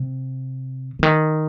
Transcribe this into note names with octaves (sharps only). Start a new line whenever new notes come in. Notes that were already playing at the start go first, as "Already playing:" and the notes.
Already playing: C3
C#3
D#3